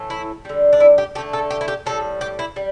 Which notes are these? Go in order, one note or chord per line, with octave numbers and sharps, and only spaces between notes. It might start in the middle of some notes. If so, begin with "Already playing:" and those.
Already playing: A2 E3 A3
E4
D3 G3
D4
E4
G4
D3 A3 G4
A4
G4
E4
G4
A2 G3 A4
G4
E4
G3